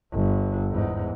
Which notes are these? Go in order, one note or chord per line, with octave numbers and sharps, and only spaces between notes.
G1
E2 G#2